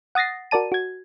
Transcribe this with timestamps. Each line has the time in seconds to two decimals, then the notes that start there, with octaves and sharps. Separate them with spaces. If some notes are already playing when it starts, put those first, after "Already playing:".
0.15 F#5 D#6 A6 A#6 C7
0.51 F#4 A#4 D5 A5 D#7
0.72 F#4 G#6